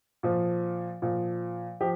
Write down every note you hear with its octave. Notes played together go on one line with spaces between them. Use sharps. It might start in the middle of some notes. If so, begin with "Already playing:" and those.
A#2 F3
A#2 F3
F3 G4